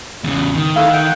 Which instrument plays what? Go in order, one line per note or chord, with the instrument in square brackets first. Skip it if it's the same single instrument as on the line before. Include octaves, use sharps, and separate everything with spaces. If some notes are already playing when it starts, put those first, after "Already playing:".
[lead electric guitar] E2 C#3
D#3
[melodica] A3 E4 [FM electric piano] F5 F#6
[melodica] F#5 G5